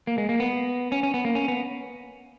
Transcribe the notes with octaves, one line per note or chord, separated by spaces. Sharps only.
A#3
G#3
A#3
B3
C#4
C#4
B3
A#3
C#4
B3